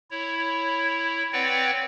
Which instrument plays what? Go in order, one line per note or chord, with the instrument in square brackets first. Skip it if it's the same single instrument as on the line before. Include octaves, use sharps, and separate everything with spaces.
[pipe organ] E4 C#5
C4 B4 C#5 D5 F#5 G5